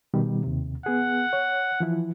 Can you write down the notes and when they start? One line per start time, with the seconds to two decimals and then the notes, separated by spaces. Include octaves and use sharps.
0.14 B2 D#3 G3
0.44 D#2 C3
0.86 B3 G#4 F#5
1.33 C#5
1.80 E3 F3 E4